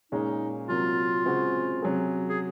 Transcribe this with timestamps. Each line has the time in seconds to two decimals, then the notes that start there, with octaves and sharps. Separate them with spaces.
0.12 A#2 G#3 C#4 D#4
0.69 C3 F#3 A#3 F4
1.26 C#3 G#3 C4 F#4
1.82 C3 F#3 C#4 G#4
2.29 G#4